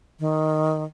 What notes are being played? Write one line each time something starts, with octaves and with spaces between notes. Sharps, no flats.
D#3